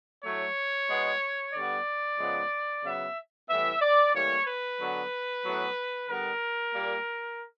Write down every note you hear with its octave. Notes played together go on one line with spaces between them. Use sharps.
A2 F#3 A3 C#5
B2 G#3 B3
D3 G3 B3 D5
C#3 F3 G#3 B3
C#3 F#3 B3 E5
A2 E3 G3 B3 E5
D5
A2 E3 G3 A#3 C#5
B4
D3 F#3 B3
A2 F#3 B3
D3 G3 B3 A#4
A#2 G3 A#3